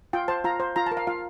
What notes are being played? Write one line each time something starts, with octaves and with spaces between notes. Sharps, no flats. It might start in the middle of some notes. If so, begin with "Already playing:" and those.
F4 G5
C5 A5
F4 A#5
C5
F4 A#5
A5
A#4
F5
F4 F5